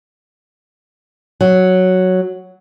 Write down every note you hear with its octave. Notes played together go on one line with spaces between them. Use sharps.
F#3